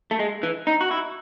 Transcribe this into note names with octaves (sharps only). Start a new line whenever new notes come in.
A3
G#3
E3
D#4
F#4
E4